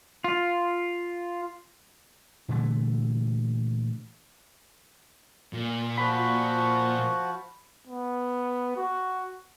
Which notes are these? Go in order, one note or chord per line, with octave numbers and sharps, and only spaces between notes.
F4
A#2 D3 E3 A3
A#2
F3 F#4 B5
B3
F#4